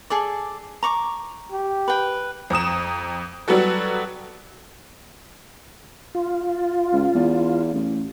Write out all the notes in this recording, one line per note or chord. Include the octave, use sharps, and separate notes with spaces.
G#4 A4 D5
A#5 C#6 D6
G4
B4 G5
F2 A#5 D#6 E7
F#3 G3 B3 F#4 A4
F4
C#2
E2
A1